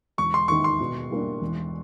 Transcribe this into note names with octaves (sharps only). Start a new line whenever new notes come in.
E1 C#6
C6
D#2 D#3 C#6
C6
B2
G3 A#3 D4
E1